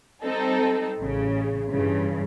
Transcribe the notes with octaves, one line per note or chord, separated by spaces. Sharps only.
G3 C4 D#4 A4
A1 C#3
G2 C#3 E3